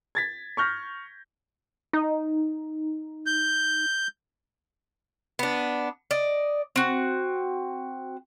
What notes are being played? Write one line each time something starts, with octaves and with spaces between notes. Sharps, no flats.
G#6 A6 B6
C#6 F6 G6 A#6
D#4
G6
B3 D4
D5 D#5
C4 F#4